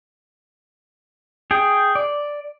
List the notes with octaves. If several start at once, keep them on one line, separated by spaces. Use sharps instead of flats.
G#4 G5
D5